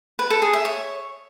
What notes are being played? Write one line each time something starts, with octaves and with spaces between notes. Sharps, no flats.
B4
A4
G#4
E5
C#5